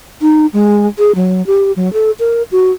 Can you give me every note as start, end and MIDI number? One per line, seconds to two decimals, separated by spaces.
0.22 0.46 63
0.53 0.87 56
0.99 1.15 68
1.15 1.45 54
1.47 1.72 67
1.76 1.92 54
1.93 2.11 69
2.20 2.42 70
2.52 2.71 66